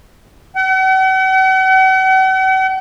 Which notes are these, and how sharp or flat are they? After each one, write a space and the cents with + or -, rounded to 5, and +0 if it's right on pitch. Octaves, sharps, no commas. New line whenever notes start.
F#5 +45